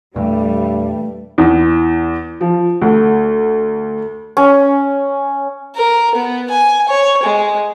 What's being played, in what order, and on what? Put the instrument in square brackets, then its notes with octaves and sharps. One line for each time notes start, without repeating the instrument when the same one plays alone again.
[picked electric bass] E2 A#2 E3 [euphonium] G2 [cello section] G3 [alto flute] A3
[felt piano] E2
F3
D2
[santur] C#4
[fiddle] A#4
B3
G#5
C#5
G#3